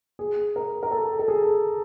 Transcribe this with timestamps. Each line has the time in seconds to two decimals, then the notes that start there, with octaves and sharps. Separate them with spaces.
0.19 G#4
0.56 A#4
0.83 A#4
0.91 A4
1.19 A4
1.28 G#4